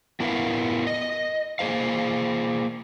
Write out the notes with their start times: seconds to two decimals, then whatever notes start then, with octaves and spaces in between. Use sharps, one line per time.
0.20 B3 E4 A#4 B4 E5 F5
0.87 D#5
1.59 A#3 G#4 C5 F5